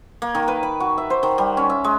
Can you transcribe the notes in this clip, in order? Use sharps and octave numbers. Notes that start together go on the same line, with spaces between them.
A#3
D#3
B4
B5
F#4
E5
C5
D#3
G3
C#4
E5
G#3